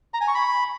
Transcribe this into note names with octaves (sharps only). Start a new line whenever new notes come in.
A#5
G#5
C#6
B5